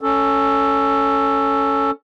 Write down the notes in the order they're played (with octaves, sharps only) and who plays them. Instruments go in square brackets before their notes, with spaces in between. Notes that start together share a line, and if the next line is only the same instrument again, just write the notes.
[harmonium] C#4 A4